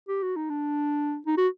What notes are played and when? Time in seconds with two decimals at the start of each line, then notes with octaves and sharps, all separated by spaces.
0.08 G4
0.23 F#4
0.36 D#4
0.50 D4
1.26 D#4
1.37 F#4